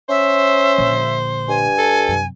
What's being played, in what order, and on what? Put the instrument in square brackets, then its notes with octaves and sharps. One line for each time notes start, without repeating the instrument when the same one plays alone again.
[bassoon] C#4 [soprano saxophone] C5 [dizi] E5
[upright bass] A#1 D3
[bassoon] G2 [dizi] G#5
[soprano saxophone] A4
[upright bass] F#2 C3